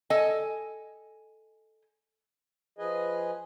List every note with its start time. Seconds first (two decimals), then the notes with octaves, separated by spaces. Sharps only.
0.10 A4 D#5 G#5
2.78 F3 G#4 B4 D#5 G#5